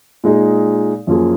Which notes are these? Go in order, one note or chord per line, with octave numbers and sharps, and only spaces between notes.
A#2 G#3 D#4 G#4
F#2 F3 A#3 F4 G#4